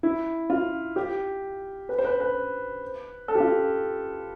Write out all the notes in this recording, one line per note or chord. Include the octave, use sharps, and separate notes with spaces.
E4
F4
G4
B4
C5
B4
B4
A4
G4
F4